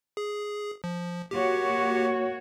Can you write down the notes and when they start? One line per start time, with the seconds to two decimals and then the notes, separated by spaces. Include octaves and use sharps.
0.17 G#4
0.84 F3
1.31 A#3 F#4 G4 C#5